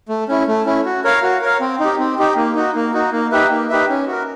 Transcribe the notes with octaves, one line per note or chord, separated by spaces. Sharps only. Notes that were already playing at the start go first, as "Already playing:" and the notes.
A3
C#4 E4
A3
C#4 E4
F#4
A#4 C#5 F5
F#4
A#4 C#5 F5
C4
D#4
G4
C4
D#4 G4
A#3
D#4 F#4
A#3
D#4 F#4
A#3
D#4 G4 B4 E5
A#3
D#4 G4 B4 E5
C#4
F#4 A#4